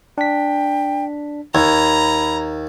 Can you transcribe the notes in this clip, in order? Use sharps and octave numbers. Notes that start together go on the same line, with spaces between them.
D4 G5 B6
D#2 A#5 B5 G#6